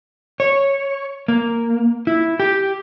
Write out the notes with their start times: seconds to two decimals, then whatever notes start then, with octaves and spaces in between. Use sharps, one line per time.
0.40 C#5
1.28 A#3
2.07 E4
2.40 G4